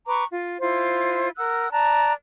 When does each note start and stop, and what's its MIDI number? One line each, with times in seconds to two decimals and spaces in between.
0.07 0.24 71
0.07 0.24 82
0.07 0.24 85
0.07 0.24 86
0.32 0.60 65
0.60 1.30 64
0.60 1.30 65
0.60 1.30 72
1.37 1.69 70
1.37 1.69 78
1.37 1.69 88
1.37 1.69 90
1.71 2.12 74
1.71 2.12 81
1.71 2.12 82
1.71 2.12 90